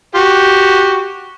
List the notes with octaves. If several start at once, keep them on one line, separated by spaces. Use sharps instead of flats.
F#4 G4